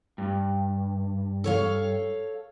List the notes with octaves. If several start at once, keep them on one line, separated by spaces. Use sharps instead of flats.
G2
A4 C#5 F5